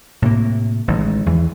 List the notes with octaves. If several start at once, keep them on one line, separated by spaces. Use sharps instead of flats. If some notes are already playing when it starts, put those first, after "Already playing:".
A2 C3 A#3
A1 D#3 G#3
E2 E3